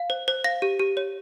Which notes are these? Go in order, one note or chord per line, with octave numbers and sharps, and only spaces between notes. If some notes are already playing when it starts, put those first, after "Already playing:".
Already playing: F5
C5
C5
F5 A#6
G4
G4
C#5